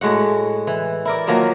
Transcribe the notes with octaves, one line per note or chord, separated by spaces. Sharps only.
A2 G#3 F#4 F#5
E3
E4 A#4 D5
D#3 F3 F#3 A#3